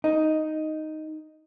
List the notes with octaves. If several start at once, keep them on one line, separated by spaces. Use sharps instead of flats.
D#4